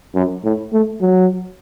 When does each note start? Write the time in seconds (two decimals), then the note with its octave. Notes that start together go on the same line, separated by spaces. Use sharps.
0.15 F#2
0.44 A2
0.73 A3
1.01 F#3